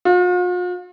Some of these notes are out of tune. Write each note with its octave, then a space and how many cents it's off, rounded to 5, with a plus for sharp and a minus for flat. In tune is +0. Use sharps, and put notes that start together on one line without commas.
F4 +45